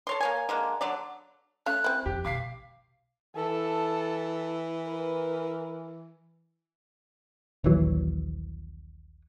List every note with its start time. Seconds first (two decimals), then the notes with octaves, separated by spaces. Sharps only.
0.07 A4 C#5 C6
0.21 A#3 C#5 G#5
0.49 D3 G#3 A#3
0.81 D3 F#3 D5
1.66 A3 C#4 F5 F#6
1.84 C4 E4
2.06 F2 G4
2.25 B1 F5 D6 B6 C7
3.37 E3 A4 A5
4.84 A#4 B4
7.64 D#1 A#1 E3 F#3